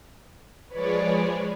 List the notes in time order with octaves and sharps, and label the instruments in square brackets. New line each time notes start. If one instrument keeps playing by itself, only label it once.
[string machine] F3 G#3 G#4 [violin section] B4 C#5 D5